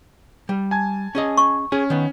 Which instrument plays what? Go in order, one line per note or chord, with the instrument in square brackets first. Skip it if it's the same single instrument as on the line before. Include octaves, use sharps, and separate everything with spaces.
[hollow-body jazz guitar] G3
[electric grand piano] G#5 A5 G#6
[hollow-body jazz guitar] C#4 G#4 D#5
[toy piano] C#6
[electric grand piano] C#4 [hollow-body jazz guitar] G#4
[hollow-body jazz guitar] D#3 B3